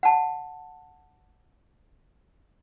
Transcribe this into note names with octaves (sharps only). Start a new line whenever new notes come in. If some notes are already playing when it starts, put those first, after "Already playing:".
F#5 A5